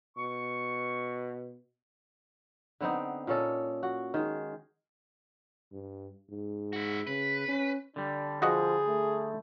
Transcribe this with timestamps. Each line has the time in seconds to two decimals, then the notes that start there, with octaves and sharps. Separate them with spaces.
0.17 B2 C#6
2.80 D3 B3 C4 D#4
3.27 A#2 C#4 A4 D#5
3.83 F#4
4.14 D#3 G#3 G#4
5.72 G2
6.30 G#2
6.73 E4 F#4
7.07 C#3 B4
7.48 C#4
7.96 D3 G3 D4
8.42 F3 F#4 G#4 D#5 F#5
8.88 A3